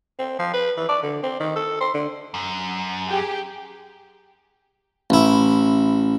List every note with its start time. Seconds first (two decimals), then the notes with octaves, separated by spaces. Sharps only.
0.19 C4
0.39 F3
0.54 B4
0.77 E3
0.89 D5
1.03 D3
1.23 C4
1.40 D#3
1.56 A4
1.81 C5
1.94 D3
2.34 F#2
3.09 G4 G#4
5.10 A1 E4